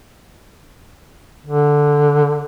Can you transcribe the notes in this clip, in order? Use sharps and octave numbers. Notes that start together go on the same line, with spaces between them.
D3